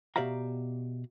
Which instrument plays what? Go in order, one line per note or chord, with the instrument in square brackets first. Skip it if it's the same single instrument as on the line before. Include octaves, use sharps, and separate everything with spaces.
[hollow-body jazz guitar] B2 G4 D5 E5 F5 A#5